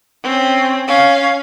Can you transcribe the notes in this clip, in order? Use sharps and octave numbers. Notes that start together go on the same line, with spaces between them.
C4 C#4
C#4 F5